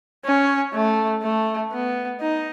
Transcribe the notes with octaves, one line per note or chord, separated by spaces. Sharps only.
C#4
A3
A3
B3
D#4